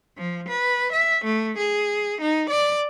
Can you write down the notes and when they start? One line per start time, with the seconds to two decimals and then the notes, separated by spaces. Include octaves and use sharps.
0.17 F3
0.49 B4
0.92 E5
1.25 A3
1.58 G#4
2.21 D#4
2.50 D5